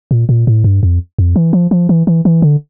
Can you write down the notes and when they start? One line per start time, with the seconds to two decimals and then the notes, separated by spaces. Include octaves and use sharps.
0.11 A#2
0.29 A#2
0.47 A2
0.64 G2
0.83 F2
1.19 F2
1.36 E3
1.53 F3
1.71 F3
1.89 E3
2.07 E3
2.25 E3
2.42 D3